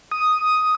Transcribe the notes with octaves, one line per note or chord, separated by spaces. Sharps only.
D#6